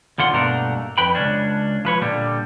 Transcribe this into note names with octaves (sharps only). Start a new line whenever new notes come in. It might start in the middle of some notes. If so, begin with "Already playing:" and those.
D#2 D3 F4 F#5 C6
G2 B2 A3 A#3 D4 A#4
F2 B4 G5 B5
C#2 F#2 C#4 D4
F3 B4 C#5
A#2 D3 G3